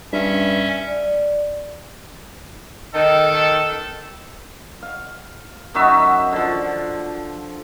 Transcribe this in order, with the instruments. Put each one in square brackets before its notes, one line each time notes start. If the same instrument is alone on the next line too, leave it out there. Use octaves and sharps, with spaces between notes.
[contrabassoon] G2 [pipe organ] C#4 E5
[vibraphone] D5
[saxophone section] D#3 [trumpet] A4
[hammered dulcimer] F5
F#2 D#4 F#4 E5
D3 F3